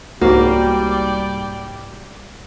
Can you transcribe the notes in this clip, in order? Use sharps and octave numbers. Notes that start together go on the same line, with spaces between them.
C2 G#2 G3 A#3 F#4 D5 G5